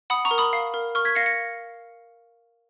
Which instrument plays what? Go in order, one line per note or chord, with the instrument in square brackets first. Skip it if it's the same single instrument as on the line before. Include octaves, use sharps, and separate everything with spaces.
[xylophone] F#5 B5 D#6
A#5 C#6
A#4
B5 D#6
F5
A#4
A#4 C#6 F6
G#6 B6
F5 A#6 C#7
A#6 C#7